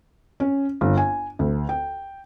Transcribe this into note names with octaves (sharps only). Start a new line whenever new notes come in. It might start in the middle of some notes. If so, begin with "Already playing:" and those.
C#4
G1
G#5
D2
G5